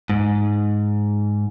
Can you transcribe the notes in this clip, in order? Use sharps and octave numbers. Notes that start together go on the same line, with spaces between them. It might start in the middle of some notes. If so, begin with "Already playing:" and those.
G#2